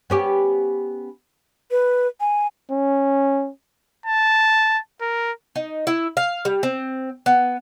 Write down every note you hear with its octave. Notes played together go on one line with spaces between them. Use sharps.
B3 C#4 G4
B4
G#5
C#4
A5
A#4
D#4
E4
F5
G3
C4
B3